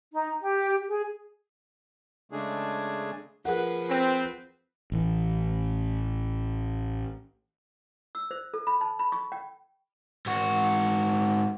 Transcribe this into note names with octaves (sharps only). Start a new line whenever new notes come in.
D#4
G4
G#4
C#3 G#3 A3 D4 G#4
F3 G#4 A#4 B4 F#5
C4
A1 E3
E6
C5
A4
B5
A5
B5
C#6
G5
G#2 F#4